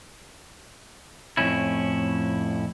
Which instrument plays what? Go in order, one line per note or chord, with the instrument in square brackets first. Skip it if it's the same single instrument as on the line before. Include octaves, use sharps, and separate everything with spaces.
[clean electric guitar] F2 A2 C#4 E4